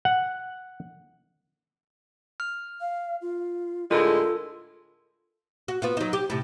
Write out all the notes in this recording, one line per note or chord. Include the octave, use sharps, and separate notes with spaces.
F#5
F6
F5
F4
A2 D3 G#3 F4 A4 A#4
F#4
B3 F4 F#4
F#3 D#4
G4
A2 C3